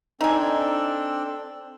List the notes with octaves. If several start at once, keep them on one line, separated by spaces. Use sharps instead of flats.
C4 D4 D#4 A4 G#5